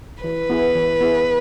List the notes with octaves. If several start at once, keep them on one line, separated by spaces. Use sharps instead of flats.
E3 B4
B3 E4 G#4
E3
B3 E4 G#4